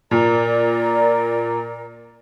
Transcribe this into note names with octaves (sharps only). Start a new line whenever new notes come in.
A#2 A#4 D5 A#5